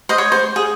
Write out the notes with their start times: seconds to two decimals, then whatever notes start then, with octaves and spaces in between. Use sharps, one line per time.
0.09 C5 D#5
0.18 C#5
0.32 C5
0.56 G#4